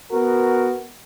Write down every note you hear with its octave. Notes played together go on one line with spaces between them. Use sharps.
B3 F#4 A#4